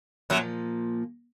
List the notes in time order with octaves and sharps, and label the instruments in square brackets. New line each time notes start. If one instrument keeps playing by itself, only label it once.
[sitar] F#2 F#3 [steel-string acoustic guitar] A#2 F3 A#3